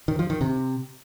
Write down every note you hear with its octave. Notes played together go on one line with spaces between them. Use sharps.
D#3
F3
D#3
C3